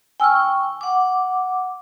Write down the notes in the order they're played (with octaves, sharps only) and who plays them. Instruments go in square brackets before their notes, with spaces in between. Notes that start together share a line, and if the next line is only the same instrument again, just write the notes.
[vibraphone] G5 C#6 [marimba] G#5 E6 F6
[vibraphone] F#5 D6